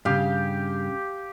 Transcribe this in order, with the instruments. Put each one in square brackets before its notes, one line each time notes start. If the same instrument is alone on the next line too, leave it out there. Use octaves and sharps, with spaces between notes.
[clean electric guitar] G2 A#2 C#3 [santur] G4 F5